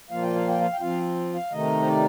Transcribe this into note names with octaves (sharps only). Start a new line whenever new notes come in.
A#2 F3 A#3 F4 F5
G5
F5
G5
F5
G5
F3 C4 F4 F5
F5
C3 D#3 A3 D#4 D#5
C5
D5